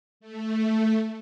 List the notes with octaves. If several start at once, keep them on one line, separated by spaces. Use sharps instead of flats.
A3